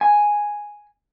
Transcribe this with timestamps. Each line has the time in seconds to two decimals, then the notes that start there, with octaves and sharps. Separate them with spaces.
0.01 G#5